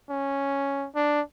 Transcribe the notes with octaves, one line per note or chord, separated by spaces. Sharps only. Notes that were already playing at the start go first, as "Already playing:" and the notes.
C#4
D4